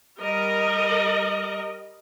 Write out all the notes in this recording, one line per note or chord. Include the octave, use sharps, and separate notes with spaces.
G3 A#4 D#5